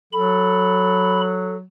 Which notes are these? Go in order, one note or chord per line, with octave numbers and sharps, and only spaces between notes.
F#3 A4 B5